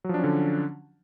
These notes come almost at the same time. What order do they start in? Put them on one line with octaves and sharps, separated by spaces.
F#3 F3 D4 C#4 D3